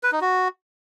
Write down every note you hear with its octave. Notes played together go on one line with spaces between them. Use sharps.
B4
D#4
F#4